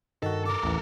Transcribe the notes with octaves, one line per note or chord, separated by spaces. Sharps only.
G2 D#3 F#4 A4 D#5
A4 A#4 D6
A1 D#2 E3